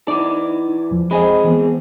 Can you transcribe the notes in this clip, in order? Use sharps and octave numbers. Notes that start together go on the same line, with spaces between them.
E3 D#4 D5 D6
E2 F3
G#3 C4 G#4 D#5 G#5 B5
E3 B3